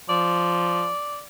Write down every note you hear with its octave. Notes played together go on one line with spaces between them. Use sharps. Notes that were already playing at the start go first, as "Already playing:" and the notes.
F3 D5